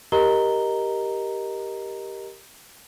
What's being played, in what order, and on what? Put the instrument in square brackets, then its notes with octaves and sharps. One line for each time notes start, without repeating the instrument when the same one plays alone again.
[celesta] G4 A#4 D#5 A#5 G7